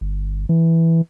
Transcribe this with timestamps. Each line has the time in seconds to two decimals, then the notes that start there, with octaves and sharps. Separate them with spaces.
0.01 G1
0.49 E3